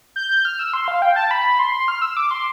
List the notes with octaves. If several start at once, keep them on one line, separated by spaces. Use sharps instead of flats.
G6
F6
E6
C6
F5
G5
A5
B5
C6
F6
E6
D6
C6